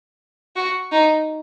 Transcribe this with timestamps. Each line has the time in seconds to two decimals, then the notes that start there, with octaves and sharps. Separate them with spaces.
0.56 F#4
0.92 D#4